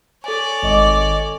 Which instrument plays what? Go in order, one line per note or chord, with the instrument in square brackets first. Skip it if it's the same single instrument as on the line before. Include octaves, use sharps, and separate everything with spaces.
[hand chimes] A4 G#5 [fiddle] C#5 D5
[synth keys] G#1 D#5 D6